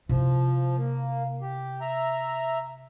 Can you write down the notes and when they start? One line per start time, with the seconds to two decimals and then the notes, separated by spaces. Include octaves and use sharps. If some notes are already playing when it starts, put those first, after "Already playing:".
0.09 C3 F3 E4
0.76 A#3
1.42 G4
1.81 E5 A#5